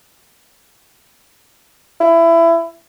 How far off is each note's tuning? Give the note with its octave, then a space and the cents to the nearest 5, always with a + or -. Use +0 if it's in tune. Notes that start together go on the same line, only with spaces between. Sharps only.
E4 +20